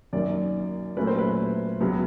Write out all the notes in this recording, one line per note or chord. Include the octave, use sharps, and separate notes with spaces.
F#2 D#3 F#3 A#3 C#4 D5
A#2 F#3 A3 C#4 B4
C5
B4
C#2 C#3 F#3 B3